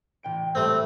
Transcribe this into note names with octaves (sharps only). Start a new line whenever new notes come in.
A1 G5 D7
A2 G3 A3 C4